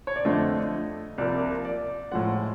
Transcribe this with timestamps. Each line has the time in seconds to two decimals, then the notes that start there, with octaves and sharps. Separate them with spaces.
0.07 C#5
0.16 D5
0.25 F2 D3 F3 A3 C4 D#5
1.18 C2 C3 F3 A#3 D5
1.65 D5
2.11 A2 F3 G#3 F#5